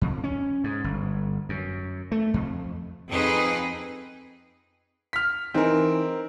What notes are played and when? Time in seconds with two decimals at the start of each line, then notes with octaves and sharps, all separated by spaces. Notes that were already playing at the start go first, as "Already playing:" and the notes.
0.01 F2
0.24 C#4
0.64 G#2
0.84 G1
1.49 F#2
2.12 A3
2.34 F2
3.10 F2 C4 D#4 G#4 B4
5.13 F6 B6
5.54 E3 C4 D#4 G#4 A#4